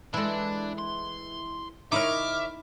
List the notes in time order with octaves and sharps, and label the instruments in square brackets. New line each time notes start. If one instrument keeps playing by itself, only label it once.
[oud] E3 G#3 [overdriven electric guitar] D4 [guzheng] E4 A4
[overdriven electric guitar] C6
[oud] C#3 A#4 C#5 [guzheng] D#4 E4 [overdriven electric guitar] E5 [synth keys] D6 F6